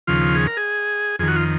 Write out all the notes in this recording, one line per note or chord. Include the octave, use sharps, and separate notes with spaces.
D#2 C#3 F3 F4
G#4
A#4
G#4
F2 D#3 G#4
F#4
F4